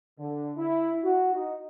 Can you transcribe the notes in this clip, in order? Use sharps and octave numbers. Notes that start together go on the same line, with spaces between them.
D3
E4
F#4
D#4